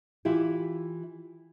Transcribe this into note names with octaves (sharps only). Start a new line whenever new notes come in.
E3 E4 F4 G4